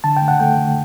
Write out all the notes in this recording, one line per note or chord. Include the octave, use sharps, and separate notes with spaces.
D3 A5
G5
A3
F#5
A3 G5
D3